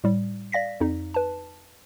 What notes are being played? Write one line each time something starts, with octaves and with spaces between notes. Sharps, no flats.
A2 G3
D5 F5 A#6 B6
F2 D#4
B4 A5